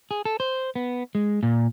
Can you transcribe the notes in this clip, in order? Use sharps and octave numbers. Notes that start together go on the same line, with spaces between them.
G#4
A4
C5
B3
G#3
A#2